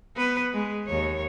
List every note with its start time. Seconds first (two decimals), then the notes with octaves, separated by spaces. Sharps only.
0.16 B3 B4
0.53 G#3
0.86 D#2 C#5